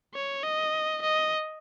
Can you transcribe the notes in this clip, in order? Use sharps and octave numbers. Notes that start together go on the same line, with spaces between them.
C#5
D#5
D#5